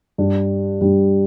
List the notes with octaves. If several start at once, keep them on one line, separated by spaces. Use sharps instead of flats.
G2 G3 D4
G2 G3 D4